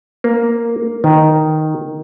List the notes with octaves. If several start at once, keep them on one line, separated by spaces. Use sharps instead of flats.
A#3
D#3